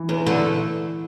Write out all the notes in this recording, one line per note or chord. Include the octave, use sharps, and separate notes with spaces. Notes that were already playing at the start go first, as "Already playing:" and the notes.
Already playing: E3
E2
D3 A3